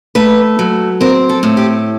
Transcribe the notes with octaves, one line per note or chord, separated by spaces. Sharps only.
A3 B4
F#3
C4 A#4
A4
A2
G4